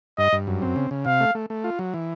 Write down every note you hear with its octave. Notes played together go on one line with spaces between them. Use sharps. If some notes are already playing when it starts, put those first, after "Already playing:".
G2 D#5
G2
F#2
C4
C#3
C#3
C3 F5
A3
A3
A3
F4
F#3
E3